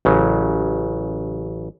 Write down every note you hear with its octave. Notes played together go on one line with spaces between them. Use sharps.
A1 C#3 F#3